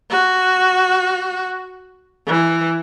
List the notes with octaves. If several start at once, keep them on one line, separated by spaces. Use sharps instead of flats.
F#4
E3